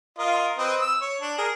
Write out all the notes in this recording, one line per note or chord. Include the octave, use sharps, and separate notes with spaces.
F4 A#4 D#5
C4 B4 D#5
E6
C#5
D4
G#4 A#4